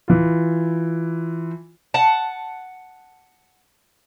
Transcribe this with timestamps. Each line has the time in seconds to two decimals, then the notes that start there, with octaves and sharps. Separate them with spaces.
0.08 E3 F4
1.94 F#5 A5